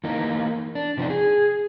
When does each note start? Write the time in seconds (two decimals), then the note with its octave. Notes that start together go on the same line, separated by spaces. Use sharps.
0.04 E3 A#3 D#4
0.75 D4
0.97 C3 F3 B3 D4 D#4
1.10 G#4